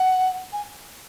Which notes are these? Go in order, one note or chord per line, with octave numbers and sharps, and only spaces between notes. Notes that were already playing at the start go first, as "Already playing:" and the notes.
Already playing: F#5
G#5